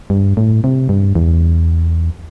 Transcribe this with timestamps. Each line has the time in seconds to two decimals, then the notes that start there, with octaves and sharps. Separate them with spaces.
0.10 G2
0.37 A2
0.64 C3
0.89 G2
1.15 E2